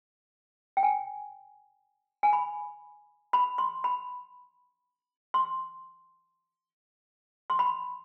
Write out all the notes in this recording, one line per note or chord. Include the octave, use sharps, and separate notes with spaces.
G5
G#5
G#5
B5
B5
C6
B5
C6
C6
B5